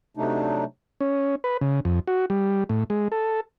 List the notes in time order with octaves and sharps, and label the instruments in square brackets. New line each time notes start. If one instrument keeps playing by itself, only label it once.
[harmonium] C3 F#3 A3 D4 D#4
[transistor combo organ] C#4
B4
C#3
F2
F#4
G3
A2
G#3
A4